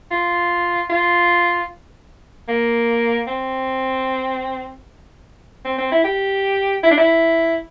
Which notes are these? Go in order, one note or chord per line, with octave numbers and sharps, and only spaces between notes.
F4
F4
A#3
C4
C4
C4
E4
G4
E4
D4
E4